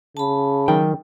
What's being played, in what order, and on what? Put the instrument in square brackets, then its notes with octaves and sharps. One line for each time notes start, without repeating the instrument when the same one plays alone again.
[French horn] C#3 [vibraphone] A5 B5
[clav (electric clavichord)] D#3 [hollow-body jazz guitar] F#3 G5